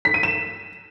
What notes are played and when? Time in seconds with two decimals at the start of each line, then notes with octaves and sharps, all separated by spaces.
0.05 B6
0.14 D#7
0.23 E7